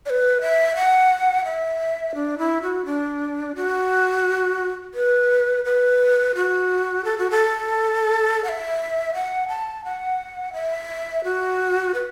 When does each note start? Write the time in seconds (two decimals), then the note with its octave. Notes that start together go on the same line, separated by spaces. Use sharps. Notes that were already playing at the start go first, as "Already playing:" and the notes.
0.06 D5
0.10 B4
0.41 E5
0.76 F#5
1.45 E5
2.15 D4
2.38 E4
2.62 F#4
2.86 D4
3.56 F#4
4.94 B4
5.65 B4
6.35 F#4
7.05 A4
7.18 F#4
7.31 A4
8.44 F#5
8.49 E5
9.14 F#5
9.48 A5
9.85 F#5
10.53 E5
11.24 F#4
11.94 B4